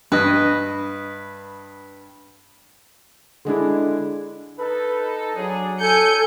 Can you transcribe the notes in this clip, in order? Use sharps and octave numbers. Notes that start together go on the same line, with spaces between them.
G2 B4 D#5
D3 G#3 D4 E4
D#4 A4 B4
F#3 D4 G#4
A4 G#5 G6 C#7